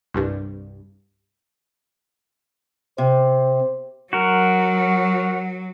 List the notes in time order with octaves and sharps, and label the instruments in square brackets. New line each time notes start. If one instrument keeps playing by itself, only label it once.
[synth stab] C2 G2
[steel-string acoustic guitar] C3 [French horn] C5
[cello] F#3 [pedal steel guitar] F#4 A#4